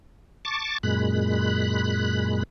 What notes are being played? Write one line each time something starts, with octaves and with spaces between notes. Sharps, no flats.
A5 C#6 D6 A6
F#2 A#2 G#3 B5 F#6